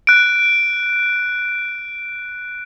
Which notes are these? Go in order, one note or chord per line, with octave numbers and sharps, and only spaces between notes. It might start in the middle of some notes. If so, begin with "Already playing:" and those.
F#6 D7